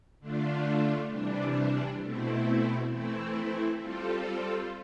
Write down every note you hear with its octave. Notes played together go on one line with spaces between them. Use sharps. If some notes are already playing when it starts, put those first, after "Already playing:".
D3 A3 D4 F4
C3 E3 G3 D4
B2 A3 C4 E4
E3 A3 C4 E4
G3 C4 F4 A4